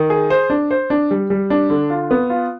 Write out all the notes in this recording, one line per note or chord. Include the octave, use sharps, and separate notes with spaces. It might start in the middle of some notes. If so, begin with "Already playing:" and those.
Already playing: D#3
G#4
C5
D4
C5
D4
G3
G3
D4
D3
F4
B3
F4